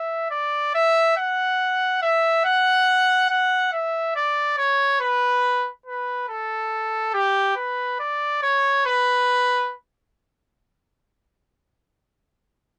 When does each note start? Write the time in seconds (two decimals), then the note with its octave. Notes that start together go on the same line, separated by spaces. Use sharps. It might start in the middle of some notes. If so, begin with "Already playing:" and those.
Already playing: E5
0.31 D5
0.74 E5
1.17 F#5
2.02 E5
2.45 F#5
3.30 F#5
3.72 E5
4.16 D5
4.58 C#5
5.01 B4
5.86 B4
6.29 A4
7.14 G4
7.56 B4
8.00 D5
8.43 C#5
8.86 B4